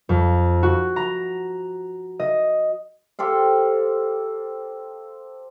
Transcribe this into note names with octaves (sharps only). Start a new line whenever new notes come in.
F2
F#4
A#5
D#5
G4 A4 C5 F5